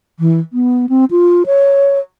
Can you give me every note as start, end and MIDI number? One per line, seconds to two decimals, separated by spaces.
0.19 0.40 52
0.53 0.86 59
0.89 1.05 60
1.11 1.43 65
1.46 1.99 73